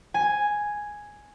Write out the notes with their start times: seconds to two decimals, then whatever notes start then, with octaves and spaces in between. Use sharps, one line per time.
0.14 G#5